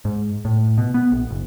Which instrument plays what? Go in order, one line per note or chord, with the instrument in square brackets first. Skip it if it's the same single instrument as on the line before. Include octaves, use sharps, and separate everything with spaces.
[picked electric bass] G#2
A2
B2
B3
A#1
F#1